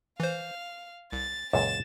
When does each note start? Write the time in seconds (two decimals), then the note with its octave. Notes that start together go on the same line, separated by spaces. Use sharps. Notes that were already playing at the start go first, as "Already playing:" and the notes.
0.20 E3 C5 F5
1.13 C2 A6
1.53 C#2 F#2 A#2 A6 E7